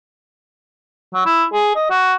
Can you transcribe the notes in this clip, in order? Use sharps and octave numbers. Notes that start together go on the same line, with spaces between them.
F#3
E4
G#4
D#5
F#4